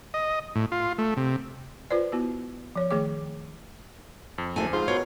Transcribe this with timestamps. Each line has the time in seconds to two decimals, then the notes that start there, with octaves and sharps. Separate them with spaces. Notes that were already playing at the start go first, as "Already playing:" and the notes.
0.14 D#5
0.55 A2
0.72 F4
0.98 A3
1.17 C3
1.90 F4 B4 C5 D5
2.12 B3 E4 F#4
2.76 F3 C#5
2.91 D#3 A3 G#4 G5 D6
4.38 F2
4.56 F#1 D2 A3 G#5
4.73 G#2 F4 C5
4.88 B2 A#4 C#5